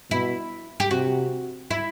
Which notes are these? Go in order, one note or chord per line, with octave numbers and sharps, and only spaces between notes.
B2 E4
G4
C3 F#4
E4